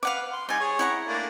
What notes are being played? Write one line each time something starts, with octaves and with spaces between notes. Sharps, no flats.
B4 F5 F#5 D6
C6
G3 D#4 G#5 C6
G#4 C#5
E4 F#5 A#5
A3 A#3 D4